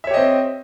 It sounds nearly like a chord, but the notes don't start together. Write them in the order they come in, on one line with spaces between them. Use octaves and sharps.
E5 C#5 G4 D#5 C4